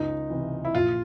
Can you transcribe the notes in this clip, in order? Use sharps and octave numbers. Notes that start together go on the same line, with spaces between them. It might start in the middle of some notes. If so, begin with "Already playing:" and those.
Already playing: C#2 D#4
C3 E3
E4
A#1 F4